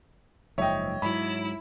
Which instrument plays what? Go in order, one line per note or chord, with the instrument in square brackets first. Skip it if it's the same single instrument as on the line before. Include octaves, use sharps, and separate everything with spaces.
[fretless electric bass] F#1 G#2 F3 [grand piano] C#5 D#5 [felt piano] E5 G5
[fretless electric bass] G#2 F#3 [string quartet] E4 [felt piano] B5